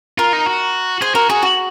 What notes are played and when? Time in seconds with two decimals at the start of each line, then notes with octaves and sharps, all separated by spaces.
0.18 F4 A#4
0.33 D#4
0.46 F#4
1.01 G#4 C5
1.15 F#4 A#4
1.30 F#4 G#4
1.43 F#4